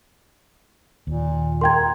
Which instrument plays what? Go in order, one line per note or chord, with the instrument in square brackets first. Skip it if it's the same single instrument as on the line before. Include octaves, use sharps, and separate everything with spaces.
[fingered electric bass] D#2 [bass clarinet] A#2
[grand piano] A#4 G5 A#5 [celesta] C6 G#6